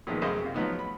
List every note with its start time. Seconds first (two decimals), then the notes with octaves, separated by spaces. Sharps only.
0.07 A#2 D#3 F3 G#3 A#3 B3
0.22 F#2 C#3 G#4 C5 D#5 F5
0.42 C3 F4
0.54 F3 F#3 B3 D#4
0.79 B5